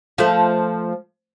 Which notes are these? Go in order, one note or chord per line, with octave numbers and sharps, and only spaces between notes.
F3 A3